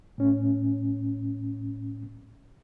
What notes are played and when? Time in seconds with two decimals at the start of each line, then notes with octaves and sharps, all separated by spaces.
0.18 A2 C#4